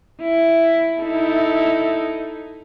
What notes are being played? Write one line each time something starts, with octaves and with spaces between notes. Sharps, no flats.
E4
D#4 E4 A4